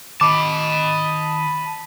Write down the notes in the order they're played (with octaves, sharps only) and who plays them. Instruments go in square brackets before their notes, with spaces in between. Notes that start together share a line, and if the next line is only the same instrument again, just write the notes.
[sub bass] D#3 [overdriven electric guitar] D#5 A5 [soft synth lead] B5 [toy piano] D6